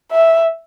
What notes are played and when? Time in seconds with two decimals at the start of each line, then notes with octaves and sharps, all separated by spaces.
0.12 E5